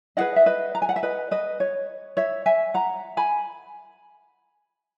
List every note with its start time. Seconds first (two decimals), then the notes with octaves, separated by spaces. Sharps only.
0.17 E4 G#4 B4 D#5 F#5
0.36 E5
0.46 B4 D#5
0.75 A#5
0.82 G#5
0.89 F#5
0.96 E5
1.03 B4 D#5
1.31 B4 D#5
1.60 C#5
2.17 C#5 E5
2.46 E5 G#5
2.74 F#5 A#5
3.17 G#5 B5